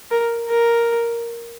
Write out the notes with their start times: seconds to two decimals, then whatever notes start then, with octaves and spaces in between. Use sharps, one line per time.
0.11 A#4
0.49 A#4